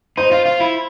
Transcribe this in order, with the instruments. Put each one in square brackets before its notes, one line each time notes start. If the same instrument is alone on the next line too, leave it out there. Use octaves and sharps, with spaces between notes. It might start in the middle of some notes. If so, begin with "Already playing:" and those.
[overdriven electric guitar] D#4 [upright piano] C5
[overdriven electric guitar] F4
F4
E4